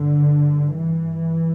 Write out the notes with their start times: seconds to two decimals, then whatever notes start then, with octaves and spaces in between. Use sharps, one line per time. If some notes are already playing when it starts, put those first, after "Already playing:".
Already playing: G2 D3
0.75 E3